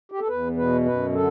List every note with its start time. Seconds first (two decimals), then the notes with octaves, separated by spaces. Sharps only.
0.12 G4
0.20 A4
0.28 E2 B4
0.57 B2 B4
0.86 F#2 B4
1.14 D3 A4